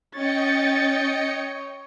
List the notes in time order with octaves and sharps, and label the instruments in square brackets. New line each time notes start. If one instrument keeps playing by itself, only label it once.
[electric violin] C#4 A6 [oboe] C#5 [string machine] D#5 G5 C#7